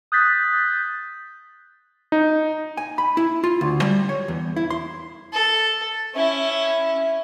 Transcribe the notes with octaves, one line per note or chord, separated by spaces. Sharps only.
D#6 F#6 G6 A6 B6
D#4
G#5
B5
E4
F4
D2
G3
C#5
E2
E4
C6
A4
C#4 E4